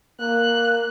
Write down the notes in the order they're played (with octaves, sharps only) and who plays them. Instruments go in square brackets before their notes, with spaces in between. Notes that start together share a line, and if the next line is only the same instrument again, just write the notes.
[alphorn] A#3 [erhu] F#6